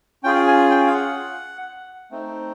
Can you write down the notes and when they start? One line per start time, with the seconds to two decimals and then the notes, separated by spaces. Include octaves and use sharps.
0.23 C#4 F4 G#4 G5
0.48 G#5
0.70 G5
0.87 F5
0.94 F#5
2.11 A3 C4 D#4